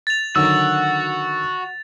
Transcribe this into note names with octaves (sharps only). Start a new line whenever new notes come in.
A6 F7
D3 D#3 F#3 F#4 E6